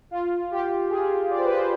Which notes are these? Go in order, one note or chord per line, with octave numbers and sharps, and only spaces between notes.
F4
G4
G#4
D5
C5
B4
C5